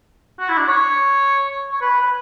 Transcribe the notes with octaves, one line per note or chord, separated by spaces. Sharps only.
F#4
E4
D4
C#5
C#5
B4
B4